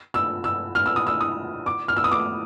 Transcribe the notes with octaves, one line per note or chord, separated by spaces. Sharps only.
E6
E6
F6
E6
D#6
E6
D#6
D6
F6
E6
D#6
D6